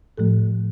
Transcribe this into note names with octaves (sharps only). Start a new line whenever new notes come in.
A2 F3 A3 A4